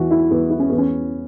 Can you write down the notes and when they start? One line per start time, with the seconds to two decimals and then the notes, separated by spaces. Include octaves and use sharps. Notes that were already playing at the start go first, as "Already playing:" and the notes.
Already playing: E2 E3 F#4
0.11 E4
0.30 E2 B3
0.50 E4
0.59 C#4
0.70 E2 B3
0.78 C#4